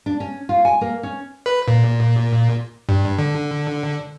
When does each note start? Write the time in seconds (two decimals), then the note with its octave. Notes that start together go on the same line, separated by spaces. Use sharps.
0.06 D4
0.20 C#4
0.49 F4
0.65 G#5
0.81 A#3
1.03 C#4
1.46 B4
1.68 A#2
2.89 G2
3.18 D3